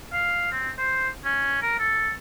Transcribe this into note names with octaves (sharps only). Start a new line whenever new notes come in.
F5
C4
C5
C#4
A#4
A4